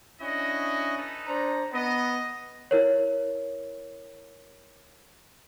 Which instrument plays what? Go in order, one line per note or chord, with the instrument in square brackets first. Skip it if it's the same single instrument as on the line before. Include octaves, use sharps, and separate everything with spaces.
[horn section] C#4 D4 E4 [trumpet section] F#4 D#5
[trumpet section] D#4 A4 B4
[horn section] D4 C5 A#5
[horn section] B3 [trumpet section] D#5
[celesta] E4 A#4 C#5